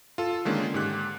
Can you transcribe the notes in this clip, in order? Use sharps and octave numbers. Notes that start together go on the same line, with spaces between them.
F4 A4
D3 D#3 G#3 A#3 C#4
G#2 G4 F#6